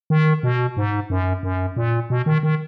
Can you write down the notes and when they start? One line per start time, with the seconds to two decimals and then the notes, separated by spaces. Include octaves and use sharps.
0.10 D#3
0.43 B2
0.77 G#2
1.10 F#2
1.43 F#2
1.76 A#2
2.10 B2
2.26 D#3
2.43 D#3